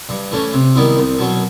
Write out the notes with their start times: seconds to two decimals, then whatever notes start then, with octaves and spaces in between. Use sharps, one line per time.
0.09 G2
0.32 E3 A3 C#4
0.53 C3
0.75 D#3 G3 B3 E4
0.97 C2
1.19 B2 F#3